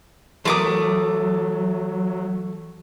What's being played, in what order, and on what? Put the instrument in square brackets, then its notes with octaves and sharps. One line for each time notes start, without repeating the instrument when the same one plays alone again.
[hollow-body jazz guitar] E3 A#4 [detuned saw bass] F#3 [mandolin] A3 D6 D#6